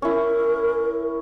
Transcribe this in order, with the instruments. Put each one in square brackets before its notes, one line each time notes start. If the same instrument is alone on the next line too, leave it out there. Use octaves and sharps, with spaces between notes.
[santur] C#4 E4 [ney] A#4